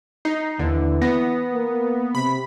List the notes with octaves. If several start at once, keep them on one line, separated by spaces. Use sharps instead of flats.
D#4 C7
D#2 D3 E3
B3 A#6
A#3
C3 B5